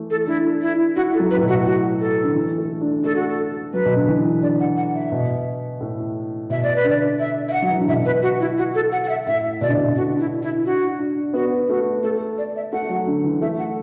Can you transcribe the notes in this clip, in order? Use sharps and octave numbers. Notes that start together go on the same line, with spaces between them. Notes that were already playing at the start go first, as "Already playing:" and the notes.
Already playing: E3 A3
A4
D4 E4
E4
E4 F#4
A4
F#3
B4
A2
B2
F#4
F#4
A4
D3
E3
A3
D4
A3 A4
F#4
A4
F#3 B4
B2
D3
E3
D3 D5
F#5
F#5
E5
B2
A2
B2 E5
D5
B4
D3 D5
E5
E5
F#5
F#3
E3
D3
B2 E5
B4
F#4
E4
F#4
A4
F#5
F#5
E5
A2 E5
B2 D5
D3
B2
D3 F#4
E4
E4
D4 F#4
D4
B3 F#4
A3 F#4
A3 A4
D5
E5
A3 F#5
F#3
D3
E3
A3 E5
F#5